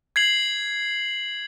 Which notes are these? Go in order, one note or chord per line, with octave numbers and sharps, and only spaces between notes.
G#6 C7 F#7